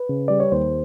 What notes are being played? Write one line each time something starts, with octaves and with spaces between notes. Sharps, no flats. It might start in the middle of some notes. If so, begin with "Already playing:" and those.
Already playing: B4
C#3
G3 D5
C#5
D#2 C5